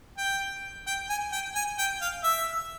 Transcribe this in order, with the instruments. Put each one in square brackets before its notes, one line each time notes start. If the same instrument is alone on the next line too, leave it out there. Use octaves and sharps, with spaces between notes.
[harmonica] G5
G5
G#5
G5
G#5
G5
F5
E5